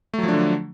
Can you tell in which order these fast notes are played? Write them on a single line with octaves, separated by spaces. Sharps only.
A3 F#3 F3 D4 D3